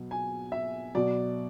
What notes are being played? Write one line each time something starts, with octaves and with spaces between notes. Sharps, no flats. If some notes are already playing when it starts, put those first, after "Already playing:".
Already playing: B2 F#3
G#5
E5
B2 F#3 D5